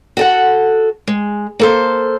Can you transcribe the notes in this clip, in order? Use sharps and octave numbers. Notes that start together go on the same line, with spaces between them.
F#4 A4 F#5
G#3
A#3 A4 C5